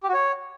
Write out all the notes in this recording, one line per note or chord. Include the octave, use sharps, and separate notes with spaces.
G4
F#4
C#5